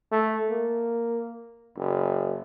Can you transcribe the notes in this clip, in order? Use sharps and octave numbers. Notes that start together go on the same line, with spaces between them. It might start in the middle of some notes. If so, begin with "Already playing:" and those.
A3
A#3
F#1